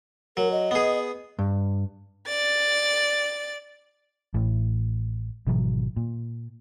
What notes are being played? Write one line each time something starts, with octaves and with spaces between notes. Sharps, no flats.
F#3 A#4
D#5
B3 G#4
G2
D5 A6
A1 A2
G#1 B2 E3 F#3
A#2